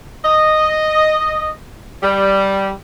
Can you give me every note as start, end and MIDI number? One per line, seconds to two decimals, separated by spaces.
0.25 1.51 75
2.02 2.70 55